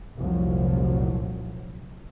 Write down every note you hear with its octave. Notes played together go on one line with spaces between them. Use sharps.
F1 C2 A#2 F3 F#3